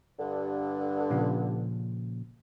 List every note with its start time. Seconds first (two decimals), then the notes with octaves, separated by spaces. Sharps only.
0.19 G2 D3
1.10 A#2 C#3 F3